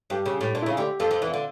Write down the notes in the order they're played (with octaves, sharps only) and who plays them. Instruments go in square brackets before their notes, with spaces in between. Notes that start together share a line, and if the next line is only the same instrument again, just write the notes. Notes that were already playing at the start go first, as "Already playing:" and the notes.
[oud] G2 [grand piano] G4
[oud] C#3
A2
[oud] A#2 [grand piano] D4
[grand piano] E4
[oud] C#3 [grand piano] F4
[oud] D2 D3 [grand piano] G4
[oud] F2 F3 [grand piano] A4
[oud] F2 F3
E2 E3
[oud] D3 [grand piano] F4